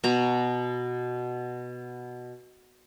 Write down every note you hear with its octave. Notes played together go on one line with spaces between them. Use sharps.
B2 A#5